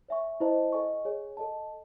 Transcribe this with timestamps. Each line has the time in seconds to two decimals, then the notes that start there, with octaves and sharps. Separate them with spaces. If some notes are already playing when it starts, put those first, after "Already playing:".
0.09 C#5 E5 G#5 C#6
0.40 E4 C5 D#5 A5
0.72 A4 D#5 G#5 C#6
1.05 G#4 C#5 G#5
1.37 A4 D#5 A5